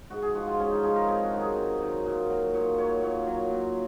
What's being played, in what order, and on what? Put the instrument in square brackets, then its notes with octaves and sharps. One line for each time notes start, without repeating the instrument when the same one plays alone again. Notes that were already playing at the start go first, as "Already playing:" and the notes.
[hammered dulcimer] G#2 F#4
G#4
F3 F#4
F4
G#2 C#4
D#4
F3 G#4
A#4
C3 G#4
F#4
D#3 F#3
G#4
C3
D#3 F#3
A#2
F#3
A#2 C#5
F#3 C#5
A#2 C#5
F#3
A#2